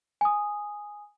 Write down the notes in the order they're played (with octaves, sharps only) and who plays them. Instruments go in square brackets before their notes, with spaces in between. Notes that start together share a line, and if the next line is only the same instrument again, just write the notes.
[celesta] G#5 D#6